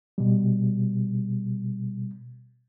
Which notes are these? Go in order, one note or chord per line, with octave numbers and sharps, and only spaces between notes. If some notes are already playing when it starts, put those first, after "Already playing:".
B2 G3